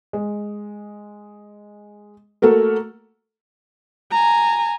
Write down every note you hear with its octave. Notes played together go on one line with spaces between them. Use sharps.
G#3
A3 A#3 F#4 A4
G#5 A#5